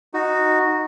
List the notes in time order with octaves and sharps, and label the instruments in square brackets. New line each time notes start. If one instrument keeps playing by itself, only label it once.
[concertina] D#4 F#4